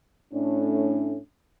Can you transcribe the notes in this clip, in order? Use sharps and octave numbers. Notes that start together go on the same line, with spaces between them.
A2 A3 C#4 D4